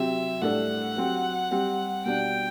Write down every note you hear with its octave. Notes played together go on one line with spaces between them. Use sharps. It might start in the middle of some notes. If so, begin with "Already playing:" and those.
Already playing: C3 F#3 C4 G4 E5
A2 G3 D4 A4 F#5
F#3 C4 G4
G3 C4 G4
B2 G3 D4 G5